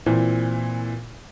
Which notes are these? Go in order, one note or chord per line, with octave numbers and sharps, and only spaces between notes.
A#2 E3 C4